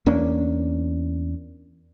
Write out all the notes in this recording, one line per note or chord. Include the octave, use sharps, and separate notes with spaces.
E2 A#3 C#4 D4